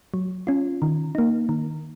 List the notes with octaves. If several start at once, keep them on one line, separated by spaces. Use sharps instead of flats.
F#3
C#4 F4
D#3
A#3 D#4
D#3